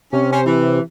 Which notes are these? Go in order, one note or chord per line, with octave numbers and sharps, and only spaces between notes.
C3 C#4
C#4 C5
E3